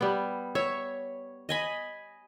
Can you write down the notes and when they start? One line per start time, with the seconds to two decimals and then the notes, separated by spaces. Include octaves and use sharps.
0.01 G3 B3
0.55 C#5 E5
1.49 D#5 G#5 B5